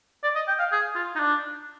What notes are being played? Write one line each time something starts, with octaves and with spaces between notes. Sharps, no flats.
D5
D#5
G5
F5
G#4
F4
D#4
D4